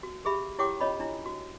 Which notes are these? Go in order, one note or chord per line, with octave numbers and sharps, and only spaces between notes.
F#4
G4 G#4 E5 B5
E4 G4 C#5 F#5 G5 D6
C#4 F4 C#5 D#5 B5
D4 E4
F#4